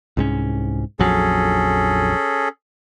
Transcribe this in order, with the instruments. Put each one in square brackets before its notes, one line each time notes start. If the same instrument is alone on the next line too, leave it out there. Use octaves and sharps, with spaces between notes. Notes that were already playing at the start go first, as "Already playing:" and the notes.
[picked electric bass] C2 G#2 C#4
[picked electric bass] A#1 F2 F#3 [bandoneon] C#4 G#4 A4